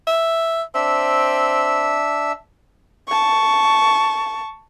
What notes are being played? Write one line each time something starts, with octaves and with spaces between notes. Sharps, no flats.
E5
C4 D4 E5
A5 C#6